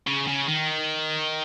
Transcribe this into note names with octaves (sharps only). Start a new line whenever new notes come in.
C#3
C#3
D#3